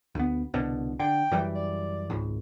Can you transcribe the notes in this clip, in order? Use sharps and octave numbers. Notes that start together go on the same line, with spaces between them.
D2 B3
C2 B2 D3
D3 G5
F#2 E3 G3
D5
G#1 C#2